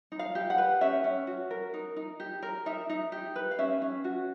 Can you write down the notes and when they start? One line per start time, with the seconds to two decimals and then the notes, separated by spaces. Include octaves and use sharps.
0.12 D#4
0.19 F5
0.35 G4
0.50 F#5
0.58 B4
0.81 C#4 E5
1.04 C#4
1.27 F#4
1.51 A#4
1.74 D#4
1.96 D#4
2.20 G4
2.42 A#4
2.66 D#4 E5
2.89 D#4
3.12 G4
3.36 B4
3.51 F5
3.58 C#4 E5
3.82 C#4
4.04 F#4